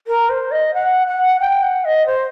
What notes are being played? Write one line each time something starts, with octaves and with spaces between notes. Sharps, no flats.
A#4
C5
D#5
F#5
F#5
G5
F#5
D#5
C5